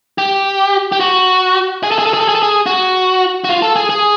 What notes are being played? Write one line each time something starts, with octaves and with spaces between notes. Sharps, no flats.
G4
G4
F#4
G#4
A4
G#4
A4
G#4
A4
G#4
A4
G#4
F#4
F#4
F4
A4
G#4
G#4